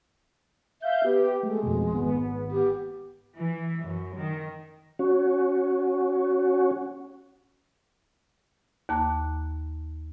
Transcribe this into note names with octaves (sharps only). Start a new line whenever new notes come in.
E5 F5 G6
B3 G4
G#3 A3
F2 B2
G#1 B3
G4
E3
F#2
D#3
C#4 F#4
D#2 A#3 A5 D6 F#6